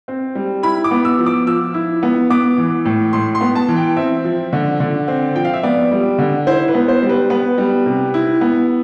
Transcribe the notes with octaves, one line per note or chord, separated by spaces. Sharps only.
C4
G3
E4 B5
D6
B3
E6
F3
D6
F3 E6
E4
B3
B3 D6
E3
A2
A2 C6
C6
B3
A5
E3
G5
C4 E5
F3
D3
D3
C4
F3 G5
F5
E5
B3 D5
G3
D3
E4 C5
B4
B3
C5
G3
B4
B3 B4
G3
C3
E4
B3